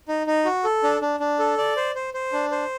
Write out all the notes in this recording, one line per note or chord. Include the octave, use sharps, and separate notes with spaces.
D#4
D#4
F#4
A4
D4
D4
D4
A4
D5
C5
C5
C5
D4
C5